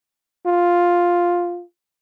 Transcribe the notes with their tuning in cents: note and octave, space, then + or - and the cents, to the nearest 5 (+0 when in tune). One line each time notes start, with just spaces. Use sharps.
F4 +5